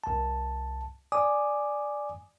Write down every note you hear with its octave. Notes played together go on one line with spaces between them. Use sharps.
C2 A5
D5 G#5 D6 D#6